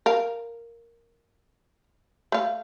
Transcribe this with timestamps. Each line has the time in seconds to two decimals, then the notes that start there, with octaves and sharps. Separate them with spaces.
0.06 A#4 F5
2.32 A3 F5